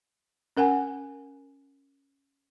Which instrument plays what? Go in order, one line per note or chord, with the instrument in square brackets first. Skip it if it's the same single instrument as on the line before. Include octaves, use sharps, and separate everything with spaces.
[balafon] C#4 A#4 F#5 G#5